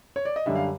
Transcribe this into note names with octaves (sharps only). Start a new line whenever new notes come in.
C#5
D5
D#5
F#2 D3 G3 E5
F5